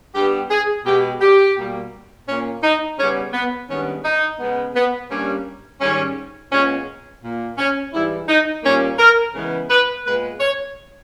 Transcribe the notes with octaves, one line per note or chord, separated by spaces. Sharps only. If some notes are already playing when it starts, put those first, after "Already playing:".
G2 G3 B3 G4
G#4
B2 G#3 B3 G4
G4
B2 G3 A#3
A#2 A#3 C#4
D#4
C#3 G3 B3 C#4
B3
G2 D#3 G#3 B3 C#4
D#4
C#3 G#3 B3
B3
G2 G3 A#3 C#4
G#2 D#3 G3 C#4
A#2 G#3 B3 C#4
A#2 A#3
C#4
G#2 E3 G3 E4
D#4
A#2 G3 A#3 C#4
A#4
C#3 E3 G#3 B3
B4
A#2 G#3 B3 B4
C#5